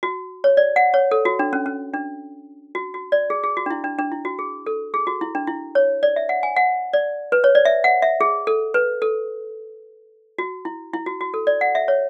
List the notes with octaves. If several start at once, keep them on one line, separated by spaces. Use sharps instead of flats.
F#4
C#5
D5
F#5
C#5
A4
F#4
D4
C#4
C#4
D4
F#4
F#4
D5
G#4
G#4
F#4
D4
E4
D4
D4
E4
F#4
G#4
A4
G#4
F#4
E4
D4
E4
C#5
D5
E5
F#5
G#5
F#5
D5
B4
C#5
D5
E5
F#5
E5
G#4
A4
B4
A4
F#4
E4
E4
F#4
F#4
A4
D5
F#5
E5
C#5